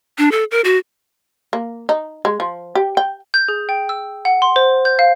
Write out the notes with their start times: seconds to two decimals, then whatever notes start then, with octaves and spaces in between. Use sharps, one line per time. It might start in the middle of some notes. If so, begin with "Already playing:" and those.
0.18 D4
0.32 A4
0.51 A#4
0.64 F#4
1.53 A#3
1.89 D#4
2.25 G#3
2.40 F3
2.75 G4
2.97 G5
3.34 G6
3.48 G#4
3.69 G5
3.89 E6
4.25 F#5
4.42 C6
4.56 C5
4.85 G6
4.99 F5